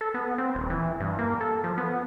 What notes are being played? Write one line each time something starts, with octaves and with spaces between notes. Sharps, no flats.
A4
B3
C4
D#1
E3
G2
A#3
A4
F3
B3